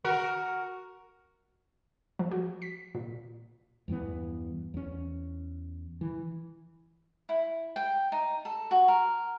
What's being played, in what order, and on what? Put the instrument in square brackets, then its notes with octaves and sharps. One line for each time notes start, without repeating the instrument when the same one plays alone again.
[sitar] F#4 A#4
[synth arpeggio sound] F3
F#4
B6
A#2
[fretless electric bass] E2 G2 E3 B3
E2 C#4
E3
[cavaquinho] E4
G5
D#4
A4
F#4
A#4